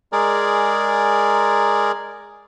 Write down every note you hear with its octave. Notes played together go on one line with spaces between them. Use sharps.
G#3 G#4 A#4 D5